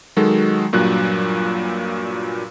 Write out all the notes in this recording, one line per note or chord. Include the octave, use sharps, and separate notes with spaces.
D#3 F#3 G#3 F#4 A4
G2 A#2 F#3 F#6